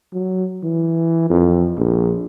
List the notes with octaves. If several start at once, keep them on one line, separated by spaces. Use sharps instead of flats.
F#3
E3
F2
A#1